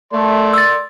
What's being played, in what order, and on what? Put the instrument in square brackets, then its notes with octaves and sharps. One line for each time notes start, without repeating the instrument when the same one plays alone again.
[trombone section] A3 [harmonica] D5 C6
[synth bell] E6 A6